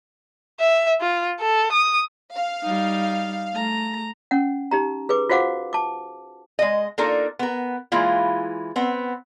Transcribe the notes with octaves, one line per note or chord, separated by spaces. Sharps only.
E5
F4
A4
D#6
F5
G3 D#4
A3 A#5
C#4 F#5
D#4 G4 A#5
G#4 B4 D6
F4 F#4 C5 F5 F#5 D6
A5 D6
G#3 D#5
A#3 D4 D#4 F4 A4 A#4
B3 A#4
E3 G#3 A#3 E4 F4
B3 C4